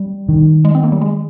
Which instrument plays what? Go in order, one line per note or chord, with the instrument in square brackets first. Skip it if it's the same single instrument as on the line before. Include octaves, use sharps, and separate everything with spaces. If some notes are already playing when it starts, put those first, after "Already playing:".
Already playing: [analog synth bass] G3
[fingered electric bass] D#3
[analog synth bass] G#3
C4
A#3
G3
G#3